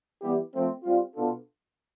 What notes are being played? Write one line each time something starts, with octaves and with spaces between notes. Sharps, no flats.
E3 G3 B3 E4 G4
F3 A3 C4
G3 C4 F4
B2 B3 D4 F4 A4